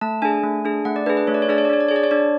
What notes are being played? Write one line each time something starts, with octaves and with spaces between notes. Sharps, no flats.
A3 A5
D4 G#4 G#5
A3
D4 G#4
A3 F#5
D5
D4 G#4 B4
B4
A3 C#5
D5
C#5
D4 G#4 D5
C#5
D5
D4 C#5
D5
G#4 C#5
D5
C#5
D4 D5